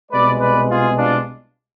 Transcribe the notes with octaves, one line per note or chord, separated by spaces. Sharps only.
C2 B2 G#3 B4 D5
B4 D5
F4 G#4
D4 F4